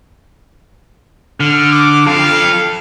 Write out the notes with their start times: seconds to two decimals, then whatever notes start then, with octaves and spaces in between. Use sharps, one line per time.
1.40 D3 F6
1.72 D6
2.07 F3 A4 F5